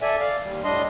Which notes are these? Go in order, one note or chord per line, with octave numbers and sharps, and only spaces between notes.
A4 D5 E5 G#5
D5 F5
D#2 G3
A2 G3 D4 D#5 C6